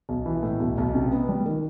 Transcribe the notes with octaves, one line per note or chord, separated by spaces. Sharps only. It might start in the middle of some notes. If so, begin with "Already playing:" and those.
B1
E3
A2
B1
B1
C3
B3
G3
D#3